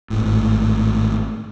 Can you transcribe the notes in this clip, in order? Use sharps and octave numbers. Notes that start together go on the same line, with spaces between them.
G#1 A2